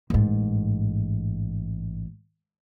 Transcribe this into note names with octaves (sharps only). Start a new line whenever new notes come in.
A1 G#2